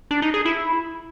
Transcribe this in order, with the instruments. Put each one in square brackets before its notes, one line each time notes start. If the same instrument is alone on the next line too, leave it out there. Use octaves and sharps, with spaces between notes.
[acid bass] D4
D#4
G#4
E4